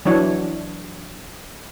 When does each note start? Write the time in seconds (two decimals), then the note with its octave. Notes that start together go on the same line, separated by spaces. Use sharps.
0.05 E3 F#3 D4 C#5